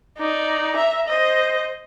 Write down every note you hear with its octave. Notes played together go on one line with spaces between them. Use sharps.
D#4 D5
E5 A#5
C5 D#5